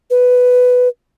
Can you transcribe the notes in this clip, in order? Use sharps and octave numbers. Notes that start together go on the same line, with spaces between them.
B4